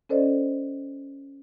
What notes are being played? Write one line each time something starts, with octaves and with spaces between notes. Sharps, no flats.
C#4 A4 C5 D5 D#5